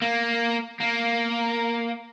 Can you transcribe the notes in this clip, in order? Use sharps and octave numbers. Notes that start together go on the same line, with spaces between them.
A#3
A#3